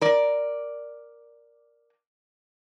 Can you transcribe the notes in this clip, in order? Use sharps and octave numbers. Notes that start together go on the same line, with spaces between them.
A#4 D5